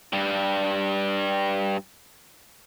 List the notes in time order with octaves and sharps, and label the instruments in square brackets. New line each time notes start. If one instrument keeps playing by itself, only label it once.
[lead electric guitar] G2 G3